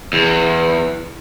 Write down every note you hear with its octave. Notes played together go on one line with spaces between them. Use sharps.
E2